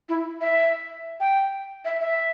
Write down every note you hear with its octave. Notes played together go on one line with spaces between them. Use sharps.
E4
E5
G5
E5
E5